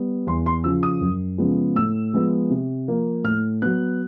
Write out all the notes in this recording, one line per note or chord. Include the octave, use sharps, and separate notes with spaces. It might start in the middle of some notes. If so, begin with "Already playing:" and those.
Already playing: G3 B3
E2 C6
C6
C#3 F3 E6
D#6
F#2
C#3 F3 G#3 B3
A2 E6
F3 G#3 B3
C3
F3 A#3
A2 F6
F#3 B3 F#6